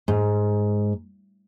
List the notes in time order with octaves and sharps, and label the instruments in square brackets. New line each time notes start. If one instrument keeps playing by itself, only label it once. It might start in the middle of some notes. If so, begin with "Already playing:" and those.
[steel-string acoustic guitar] G#2